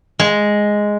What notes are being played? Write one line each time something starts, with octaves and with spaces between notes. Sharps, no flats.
G#3